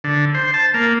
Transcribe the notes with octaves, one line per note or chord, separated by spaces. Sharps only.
D3
C5
A5
A#3